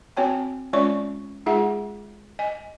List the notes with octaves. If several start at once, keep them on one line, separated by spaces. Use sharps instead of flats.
C4 F#4 C#5 G5 A5
G#3 C#4 F4 C#5 D5 C#6
G#3 D#4 F4 G#4 E5 F#5
D#5 G#5